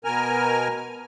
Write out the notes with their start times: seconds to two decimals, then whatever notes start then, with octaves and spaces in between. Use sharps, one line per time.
0.04 B2 A#4 G#5 F6